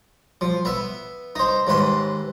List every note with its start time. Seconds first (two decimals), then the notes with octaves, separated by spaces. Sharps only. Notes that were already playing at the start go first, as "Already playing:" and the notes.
0.41 F3
0.65 B3 E5
1.36 D#4 C5
1.67 D#2 G#2 B4 C6